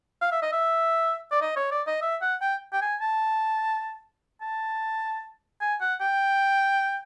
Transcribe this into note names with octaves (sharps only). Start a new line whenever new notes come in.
F5
E5
D#5
E5
D5
D#5
C#5
D5
D#5
E5
F#5
G5
G5
G#5
A5
A5
G#5
F#5
G5